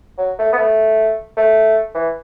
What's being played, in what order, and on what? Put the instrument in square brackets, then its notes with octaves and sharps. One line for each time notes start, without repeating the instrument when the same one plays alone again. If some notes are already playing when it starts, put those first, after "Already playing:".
[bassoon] F#3
A3
B3
A3
A3
E3